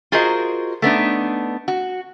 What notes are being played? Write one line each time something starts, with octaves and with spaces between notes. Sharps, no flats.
F4 F#4 G#4 A#4 C5 D#5
A3 B3 D4 D#4
F#4